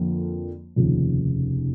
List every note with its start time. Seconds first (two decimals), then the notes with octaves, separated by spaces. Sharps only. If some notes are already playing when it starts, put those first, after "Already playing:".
Already playing: F2 D3 F3 A#3
0.76 F1 D#2 C#3 F3